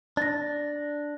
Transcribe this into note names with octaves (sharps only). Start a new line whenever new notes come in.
D4 A6 A#6